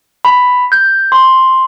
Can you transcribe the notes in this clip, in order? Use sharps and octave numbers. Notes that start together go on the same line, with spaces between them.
B5
G6
C6